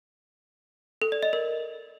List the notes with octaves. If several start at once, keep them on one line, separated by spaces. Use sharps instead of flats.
A4
D5
D#5
A#4